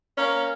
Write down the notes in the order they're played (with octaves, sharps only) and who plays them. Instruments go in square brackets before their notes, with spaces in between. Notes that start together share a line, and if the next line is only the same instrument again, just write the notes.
[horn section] A#3 C#4